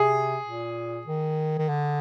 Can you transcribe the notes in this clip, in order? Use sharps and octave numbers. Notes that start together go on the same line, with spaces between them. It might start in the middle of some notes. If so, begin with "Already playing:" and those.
Already playing: C3 G#4
A#2
D#3
D#3
D3